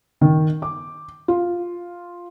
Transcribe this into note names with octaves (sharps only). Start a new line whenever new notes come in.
D#3
D6
F4